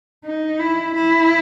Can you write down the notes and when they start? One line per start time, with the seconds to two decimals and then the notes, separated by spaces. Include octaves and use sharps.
0.25 D#4
0.59 E4
0.94 E4